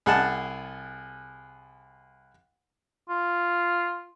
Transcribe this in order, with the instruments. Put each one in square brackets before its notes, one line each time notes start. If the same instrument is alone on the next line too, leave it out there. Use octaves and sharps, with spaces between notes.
[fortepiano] C2 G#4 F#5 A5
[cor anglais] F4